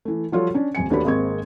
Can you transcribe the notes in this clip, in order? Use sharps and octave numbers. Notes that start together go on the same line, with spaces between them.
E3 A3
F3 G3 F4 F#4 A4 C#5
C#4 D4
D#1 F2 G#5 C#7
D#2 A3 D4 F#4 B4 B5
G#1 G#3 A#3 C4 C#6 G#6